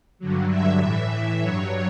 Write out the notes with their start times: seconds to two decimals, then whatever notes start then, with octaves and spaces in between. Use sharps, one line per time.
0.19 G2 D3 F#3
0.49 E5
0.80 A2 E3
1.40 G2 F#3 C#5